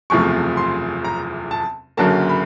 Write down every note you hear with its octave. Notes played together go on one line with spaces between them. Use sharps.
F#1 E2 C3 F3 A3 C#6
C6
A#5
A5
F#1 F#2 D3 F#3 A#3 A5
B5